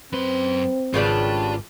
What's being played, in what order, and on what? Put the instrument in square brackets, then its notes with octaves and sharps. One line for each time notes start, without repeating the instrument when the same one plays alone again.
[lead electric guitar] F#2 C6 [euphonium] C4 [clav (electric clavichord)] B4
[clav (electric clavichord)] G#1 B4 [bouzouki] C#3 G3 D4 [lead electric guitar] F4